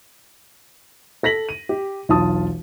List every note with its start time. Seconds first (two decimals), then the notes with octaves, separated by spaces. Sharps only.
1.23 A4 A#6 B6 F#7
1.49 D#7
1.69 G4
2.09 E1 B1 F4 A5 D#6